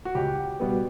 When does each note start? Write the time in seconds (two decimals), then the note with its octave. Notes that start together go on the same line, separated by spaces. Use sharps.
0.05 F#4
0.15 C#2 G4
0.60 B2 G3 B3